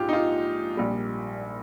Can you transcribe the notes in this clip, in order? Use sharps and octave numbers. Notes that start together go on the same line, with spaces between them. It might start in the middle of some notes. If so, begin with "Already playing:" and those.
Already playing: A#1 G#2 F4 G4
D#4
F4
A#1 A#2 G3